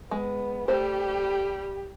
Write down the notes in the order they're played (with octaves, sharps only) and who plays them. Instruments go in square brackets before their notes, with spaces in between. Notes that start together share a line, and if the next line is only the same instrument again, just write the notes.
[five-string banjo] G#3 [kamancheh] B3
[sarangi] G3 [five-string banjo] A3 C5 [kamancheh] G4